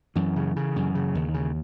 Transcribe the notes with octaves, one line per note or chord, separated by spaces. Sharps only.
F#2 E3
C#3
C#3
F#2
C#3
D#2
C#3